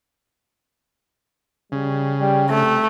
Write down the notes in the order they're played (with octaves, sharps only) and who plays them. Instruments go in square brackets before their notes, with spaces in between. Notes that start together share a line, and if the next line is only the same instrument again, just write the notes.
[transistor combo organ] C#3 [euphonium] G3
[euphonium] G3
[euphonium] C3 [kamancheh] A3